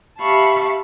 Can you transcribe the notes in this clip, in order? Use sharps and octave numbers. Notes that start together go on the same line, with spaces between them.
G4 E5 F5 A5 B5 C#6